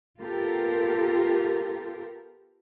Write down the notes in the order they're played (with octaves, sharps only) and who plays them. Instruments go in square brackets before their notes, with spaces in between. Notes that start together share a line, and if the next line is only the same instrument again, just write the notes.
[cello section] B3 F4 G4 A4 A#4